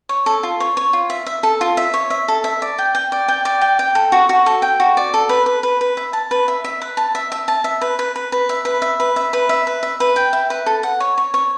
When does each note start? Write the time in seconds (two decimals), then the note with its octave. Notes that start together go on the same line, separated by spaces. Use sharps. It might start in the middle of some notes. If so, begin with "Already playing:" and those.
0.09 C#5
0.26 A4
0.43 F4
0.60 C#5
0.77 C#5
0.93 F4
1.10 E5
1.26 E5
1.43 A4
1.61 F4
1.77 E5
1.94 C#5
2.10 E5
2.28 A4
2.44 E5
2.62 D5
2.78 G5
2.95 G5
3.12 D5
3.28 G5
3.45 D5
3.61 G5
3.79 G5
3.95 A4
4.12 F#4
4.29 F#4
4.46 A4
4.62 G5
4.80 F#4
4.97 D5
5.14 A4
5.29 B4
5.46 B4
5.63 B4
5.81 B4
5.97 E5
6.13 A5
6.31 B4
6.48 E5
6.64 E5
6.82 B4
6.97 A5
7.15 E5
7.32 E5
7.48 A5
7.64 E5
7.81 B4
7.99 B4
8.16 B4
8.32 B4
8.49 E5
8.65 B4
8.82 E5
9.00 B4
9.16 E5
9.33 B4
9.49 E5
9.67 B4
9.83 E5
10.00 B4
10.16 G5
10.33 E5
10.50 B4
10.66 A4
10.83 F#5
11.00 C#5
11.18 C#5
11.34 C#5